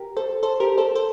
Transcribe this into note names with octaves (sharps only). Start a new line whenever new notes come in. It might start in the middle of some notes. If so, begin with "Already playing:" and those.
Already playing: G4 A#4
A4 C5
A4 C5
G4 A#4
A4 C5
A4 C5